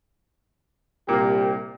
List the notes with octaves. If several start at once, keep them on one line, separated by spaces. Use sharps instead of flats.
C2 A#2 A#3 G4